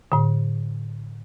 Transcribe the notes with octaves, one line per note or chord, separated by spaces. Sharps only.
A2 D3